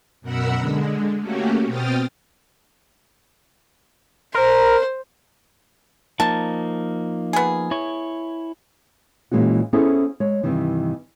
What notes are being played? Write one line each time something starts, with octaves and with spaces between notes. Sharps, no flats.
F#2 B2 A#4 F#5 B5 E6
D3 G#3
A3 A#3 C#4 F#4 G4
B2 C4 G5 D#6 F6 A6
A#4 C5
F3 A#3 D#4 A5
B3 G#4
E4 C#5
A#2 E3 G#3 C#4 F#4
B3 C#4 E4 G#4 A4 C5
G#3 C#5
G2 C3 D#3 E3